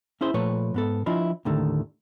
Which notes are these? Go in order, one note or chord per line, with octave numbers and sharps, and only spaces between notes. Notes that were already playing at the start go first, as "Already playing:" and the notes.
C#4 E4 G#4 C5
A#2 F3 A3 B4 C#5
G#2 B3 A4
F3 D4 E4 F4 D#5 E5
D#2 A2 D3 D#3 A3